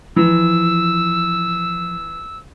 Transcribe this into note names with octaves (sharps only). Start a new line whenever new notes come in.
E3 F3 A#5 E6